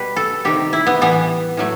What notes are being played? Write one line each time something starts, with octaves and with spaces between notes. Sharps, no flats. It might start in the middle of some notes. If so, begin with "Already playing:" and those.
Already playing: B2 G3 B4
A4
C3 D#3 G3 G4
E4
B3
A2 E3 G3 B3
A2 F#3 A3